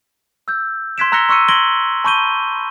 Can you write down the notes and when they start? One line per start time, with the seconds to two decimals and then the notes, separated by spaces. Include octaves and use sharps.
0.48 E6 G6
0.98 C6 F#6 G#6 B6 D7 E7
1.12 A#5 E6 F#6 A#6 C#7 G7
1.29 C6 C#6 E6 F#6 C#7 D#7
1.48 C6 G#6 A#6 D7 F#7 G7
2.04 A5 B5 C#6 G6 D#7 G7